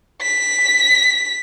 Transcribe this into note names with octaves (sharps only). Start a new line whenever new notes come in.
B6